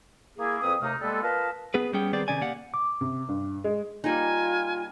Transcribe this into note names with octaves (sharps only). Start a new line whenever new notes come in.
A#3 E4 G#4
F2 C4 B4 D#6
D#2 C3 A3 D#4 F5 D#6
G3 G#3 A#3 B3 A4
F4 A#4 B4 D#5 F5 A5
B3 G#4 B4
G3 B3 C#4 G#4 G5
D#3 G3 B3 C4 G#4 D5
C3 D#3 C#4 D5 G#5
A#3 G4 D5 F5 F#5
D6
C3
G2
G#3
G3 A#3 D#4 F4 G#5